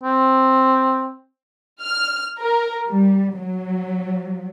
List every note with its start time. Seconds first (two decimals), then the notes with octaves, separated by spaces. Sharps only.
0.03 C4
1.82 F6
2.39 A#4
2.87 G3
3.38 F#3